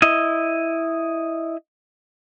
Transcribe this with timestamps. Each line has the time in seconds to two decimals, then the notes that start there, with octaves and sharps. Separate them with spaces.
0.02 E4 D#5